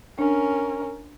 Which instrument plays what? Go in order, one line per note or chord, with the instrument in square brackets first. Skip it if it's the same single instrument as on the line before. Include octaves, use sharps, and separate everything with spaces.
[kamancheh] C#4 A#4 [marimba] D4